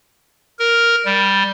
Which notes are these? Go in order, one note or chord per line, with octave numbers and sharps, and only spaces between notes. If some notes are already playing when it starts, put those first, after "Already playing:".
A#4
G3